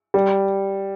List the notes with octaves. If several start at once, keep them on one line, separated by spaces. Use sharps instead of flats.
G3